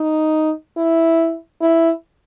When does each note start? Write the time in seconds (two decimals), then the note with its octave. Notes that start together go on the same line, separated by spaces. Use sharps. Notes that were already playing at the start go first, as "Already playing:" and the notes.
Already playing: D#4
0.77 E4
1.61 E4